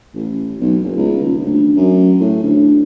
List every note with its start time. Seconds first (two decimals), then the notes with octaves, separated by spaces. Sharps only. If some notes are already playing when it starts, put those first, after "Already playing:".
0.15 A1
0.60 B1
0.84 F#1
0.96 C#2
1.20 D#1
1.44 D2
1.76 F#2
2.21 A2
2.43 D2